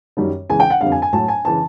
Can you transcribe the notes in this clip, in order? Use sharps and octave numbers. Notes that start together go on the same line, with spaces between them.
F#2 D#3 G3
C#2 C#3 E3 G#3 G#5
G5
F#5
F2 D3 G3 F5
G#5
G#5
A2 F#3 A5
G#5
C#3 E3 A5